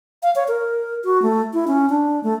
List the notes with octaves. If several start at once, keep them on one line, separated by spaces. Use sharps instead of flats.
F5
C#5
A#4
F#4
A3
E4
C#4
D4
A3